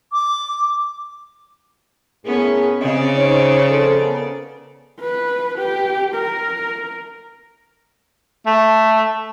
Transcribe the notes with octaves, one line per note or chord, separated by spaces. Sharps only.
D6
A2 B3 C#4 G#4 A#4
C#3 C4 D5 D#5
D#4 C5 C#5
F2 A4 C5
B3 C#4 A#4
B4
G4
A#4
A3